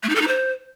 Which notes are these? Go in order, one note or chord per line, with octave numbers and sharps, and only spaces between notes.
A3
D#4
A4
D#4
C5